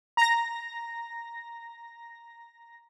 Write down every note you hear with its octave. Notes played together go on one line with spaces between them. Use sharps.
A#5 A#6